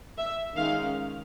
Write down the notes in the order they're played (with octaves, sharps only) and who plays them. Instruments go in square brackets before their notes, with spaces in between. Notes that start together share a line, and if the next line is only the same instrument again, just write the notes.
[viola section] E5
D#3 G#3 C#4 F5